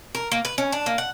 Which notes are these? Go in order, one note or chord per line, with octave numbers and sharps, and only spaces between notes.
A#4
A#3
B4
C#4
D4
A#3
F#5